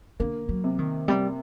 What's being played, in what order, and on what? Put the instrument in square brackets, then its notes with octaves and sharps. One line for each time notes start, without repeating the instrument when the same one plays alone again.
[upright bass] D3 [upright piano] A#3
[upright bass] F#3
[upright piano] C3
[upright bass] D#3
[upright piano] C3 [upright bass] G3